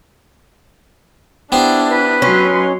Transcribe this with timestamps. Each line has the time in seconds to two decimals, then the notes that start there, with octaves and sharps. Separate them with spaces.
1.52 B3 D4 E4 G4 C5
1.88 B4
2.22 F#3 C#4 D#4 C6